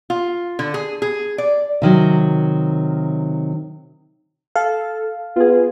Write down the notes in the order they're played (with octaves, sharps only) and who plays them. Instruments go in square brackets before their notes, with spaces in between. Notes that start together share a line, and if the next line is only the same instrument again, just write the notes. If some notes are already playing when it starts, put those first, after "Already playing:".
[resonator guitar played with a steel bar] F4
D3
G#4
G#4
D5
[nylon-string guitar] C3 D#3 F#3
[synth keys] A4 [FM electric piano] F5
[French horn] B3 [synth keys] F4 G#4